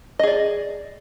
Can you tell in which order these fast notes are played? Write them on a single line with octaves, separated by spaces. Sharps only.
D#5 G#4 D5